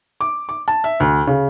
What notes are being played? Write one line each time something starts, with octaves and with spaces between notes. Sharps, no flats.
D6
D6
A5
E5
D2
C#3